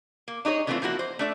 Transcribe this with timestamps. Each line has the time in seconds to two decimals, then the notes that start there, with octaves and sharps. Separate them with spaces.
0.28 A#3
0.45 D4 D#4 G#4 C#5
0.67 D3 E3 A3 B3 C4 F4
0.82 F3 A#3 E4 F#4
0.99 C5
1.19 A3 D4 E5